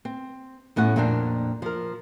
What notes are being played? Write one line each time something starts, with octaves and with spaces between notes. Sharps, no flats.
C4
E2 A2 C#4 F#5
F2 A#2 A#3 C4 D4
F3 A#4